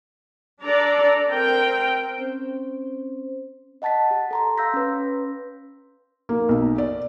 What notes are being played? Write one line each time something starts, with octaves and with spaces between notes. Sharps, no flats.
D4 A4 D5 A#5
C4 A#4 G5
C4 C#4 C5
D#5 F#5 A5 A6 B6
G4
A4 A#5 C6
F5 C6 E6 G6 A#6 B6
C#4 B4
A#3
B1
D5